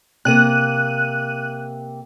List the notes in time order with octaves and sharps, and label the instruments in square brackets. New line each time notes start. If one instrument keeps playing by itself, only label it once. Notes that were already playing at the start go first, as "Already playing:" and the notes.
[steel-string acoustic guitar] C3 A#3 [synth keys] F#6 D#7